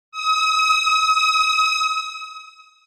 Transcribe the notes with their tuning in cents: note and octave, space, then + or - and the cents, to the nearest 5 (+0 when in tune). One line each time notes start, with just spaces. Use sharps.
D#6 +40